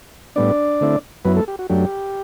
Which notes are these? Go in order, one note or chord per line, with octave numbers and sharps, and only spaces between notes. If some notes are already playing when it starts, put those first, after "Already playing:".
A2 G3 B3 D4 D5
D3 A3 C4 E4
F#2 F#3 B3 E4 B4
A3 A4
G4
F#4
F#2 F#3 A3 D4 G4